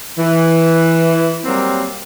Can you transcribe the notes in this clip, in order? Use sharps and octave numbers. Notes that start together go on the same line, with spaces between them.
E3
F#3 G3 A#3 C4